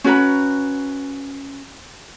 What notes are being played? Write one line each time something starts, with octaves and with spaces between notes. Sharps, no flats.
C#4 F#4 B4 A#5